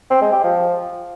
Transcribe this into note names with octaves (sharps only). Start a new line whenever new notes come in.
C4
G#3
G4
F3